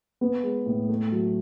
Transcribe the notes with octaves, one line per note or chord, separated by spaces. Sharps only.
B3
G#3
A2
A3
F#3